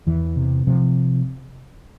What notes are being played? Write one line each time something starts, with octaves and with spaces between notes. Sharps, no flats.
E2 E3
C3
C3 F3